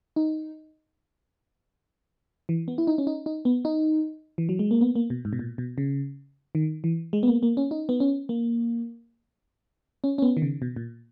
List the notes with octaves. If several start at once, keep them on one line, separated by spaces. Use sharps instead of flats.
D#4
E3
B3
E4
D#4
C#4
D#4
D#4
B3
D#4
E3
F#3
G#3
A#3
B3
A#3
B2
G#2
B2
A#2
B2
C#3
D#3
E3
G#3
B3
A#3
A#3
C#4
D#4
B3
C#4
A#3
C#4
C#4
B3
D#3
C#3
B2
A#2